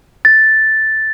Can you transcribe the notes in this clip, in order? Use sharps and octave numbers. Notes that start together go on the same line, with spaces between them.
A6